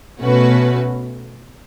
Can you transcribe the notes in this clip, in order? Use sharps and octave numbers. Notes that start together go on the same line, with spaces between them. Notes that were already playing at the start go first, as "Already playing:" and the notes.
B2 A3 C#4 F#4 B4